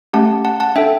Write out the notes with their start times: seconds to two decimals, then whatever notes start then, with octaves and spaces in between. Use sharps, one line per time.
0.13 A3 C#4 G4 F#5 A5
0.45 F#5 A5
0.60 F#5 A5
0.76 D4 A4 E5 G5